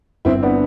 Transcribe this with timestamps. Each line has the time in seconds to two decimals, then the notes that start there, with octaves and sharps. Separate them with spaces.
0.25 G1 C4 E4
0.43 B3 D4